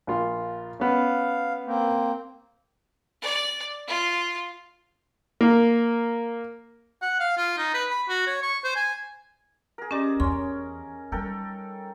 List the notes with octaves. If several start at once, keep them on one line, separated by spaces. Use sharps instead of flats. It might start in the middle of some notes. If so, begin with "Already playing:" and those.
A#1 F4
B3 C#4 F5
A#3 C4
D5
F4
A#3
F#5
F5
F4
D#4
B4
B5
F#4
C#5
C#6
C5
G#5
G#4 A#4
C#4 G4 D5 D#5 A#5
E2 C#4 C6
G3 D#4 A4 A#4 G5